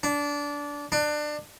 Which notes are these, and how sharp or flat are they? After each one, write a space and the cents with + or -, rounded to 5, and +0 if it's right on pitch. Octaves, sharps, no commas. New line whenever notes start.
D4 -20
D4 +25